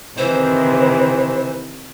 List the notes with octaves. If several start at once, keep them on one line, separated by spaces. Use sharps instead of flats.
C3 D#3 E3 C5